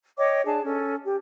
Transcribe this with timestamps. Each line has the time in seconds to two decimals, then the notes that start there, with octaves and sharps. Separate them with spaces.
0.17 C#5 D#5 G5 D6
0.45 D4 G#4 A5
0.64 C#4 A4
1.03 G4